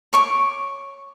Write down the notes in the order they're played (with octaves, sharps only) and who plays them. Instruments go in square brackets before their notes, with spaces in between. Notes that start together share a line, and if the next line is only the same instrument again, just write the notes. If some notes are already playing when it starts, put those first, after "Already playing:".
[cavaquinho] C#5 C#6 D6